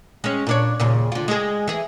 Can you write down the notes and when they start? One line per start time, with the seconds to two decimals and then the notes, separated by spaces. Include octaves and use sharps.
0.24 G#3 C#4
0.47 A#2 D4 C#5
0.80 D#2 A#2 C#3
1.12 D3 F4
1.28 G#3 G#4
1.68 E3 G#4